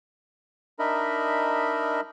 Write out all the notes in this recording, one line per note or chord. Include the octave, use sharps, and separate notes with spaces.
D4 D#4 A#4 D#5 E5 B5